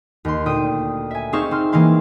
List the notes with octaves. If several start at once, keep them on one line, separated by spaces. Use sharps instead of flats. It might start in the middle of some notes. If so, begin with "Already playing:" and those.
D#2 C6
D2 A#2 G5 D#6 D#7
E5 G#5
C4 D#4 G#4 F5 C#6 E7
C4 C6 F6
E3 G#3 A#3 F5 C6